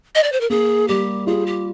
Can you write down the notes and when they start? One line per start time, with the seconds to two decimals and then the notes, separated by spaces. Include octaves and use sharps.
0.15 D#5
0.23 D5
0.32 C5
0.41 A#4
0.50 A#3 G#4
0.88 G3 G4
1.27 F4 G#4
1.46 G4